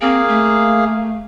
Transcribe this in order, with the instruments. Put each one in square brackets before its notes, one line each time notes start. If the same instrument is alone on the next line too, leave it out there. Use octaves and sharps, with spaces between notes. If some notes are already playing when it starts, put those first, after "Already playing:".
[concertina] A#3 G#4 F5 [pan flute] C4
[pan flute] A3